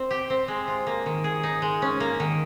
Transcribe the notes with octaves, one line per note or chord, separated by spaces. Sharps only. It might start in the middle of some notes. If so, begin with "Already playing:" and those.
Already playing: C4
G4
C4
G#3
F4
A#3
D#3
G#4
D#4
G#3
C#4
A#3
D#3